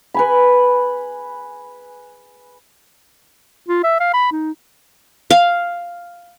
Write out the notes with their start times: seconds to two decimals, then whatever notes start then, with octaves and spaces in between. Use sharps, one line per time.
0.14 B4 G#5 B5
3.69 F4
3.84 E5
4.00 F5
4.14 B5
4.32 D#4
5.30 F5